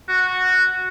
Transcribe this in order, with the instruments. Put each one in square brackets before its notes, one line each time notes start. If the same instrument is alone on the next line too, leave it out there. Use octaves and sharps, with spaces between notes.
[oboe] F#4